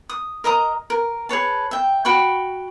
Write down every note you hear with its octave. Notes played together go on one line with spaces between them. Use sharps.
D#6
A#4 D#5 A#5 D#6
A#4
G#4 B4 C#5 A5
E5 G5
F#4 G5 B5 C#6